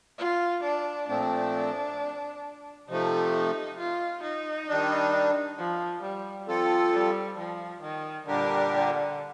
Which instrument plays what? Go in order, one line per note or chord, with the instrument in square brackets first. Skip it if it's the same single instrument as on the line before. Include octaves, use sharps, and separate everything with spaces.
[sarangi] F4
D4
[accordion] A#2 F3 A3 C4 [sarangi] D4
[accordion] C3 F3 A3 [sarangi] D#4
[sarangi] D#4
F4
D#4
[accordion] D#3 G3 D4
[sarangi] F3
G3
[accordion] F3 C4 F4 A4
[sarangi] G3
F3
D#3
[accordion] A#2 G3 D4 G4 A#4 [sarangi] D3
[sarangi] D3